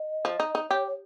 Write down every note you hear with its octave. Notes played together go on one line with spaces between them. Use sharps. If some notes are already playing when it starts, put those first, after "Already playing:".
Already playing: D#5
F3
D#4
D#4
G4 C#5
C#5